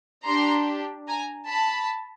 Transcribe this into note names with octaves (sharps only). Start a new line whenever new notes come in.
D4 G4 A#5 C6
G#5 A#5
A5 B5